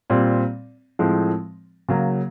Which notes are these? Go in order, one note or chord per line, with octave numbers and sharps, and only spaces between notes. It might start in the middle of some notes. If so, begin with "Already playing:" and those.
A#2 G3 C4
A2 F3 G#3 C4
C#3 F#3 A#3